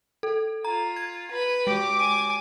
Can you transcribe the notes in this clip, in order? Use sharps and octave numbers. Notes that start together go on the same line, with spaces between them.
A4
F4 A#5
G#6
B4 B5
G#3 G4 D6
G#5